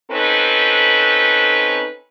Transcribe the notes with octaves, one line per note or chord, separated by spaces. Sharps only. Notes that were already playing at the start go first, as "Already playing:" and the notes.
C4 C#4 D#4 A4 B4